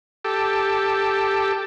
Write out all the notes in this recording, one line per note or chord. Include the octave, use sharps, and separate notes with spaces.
G4 A4